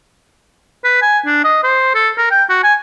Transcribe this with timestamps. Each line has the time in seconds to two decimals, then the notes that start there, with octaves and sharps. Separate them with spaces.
0.84 B4
1.02 G#5
1.26 D4
1.44 D#5
1.64 C5
1.95 A4
2.18 A#4
2.31 G5
2.49 F#4
2.64 G#5